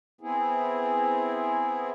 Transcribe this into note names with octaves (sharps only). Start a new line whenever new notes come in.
B3 C4 E4 G#4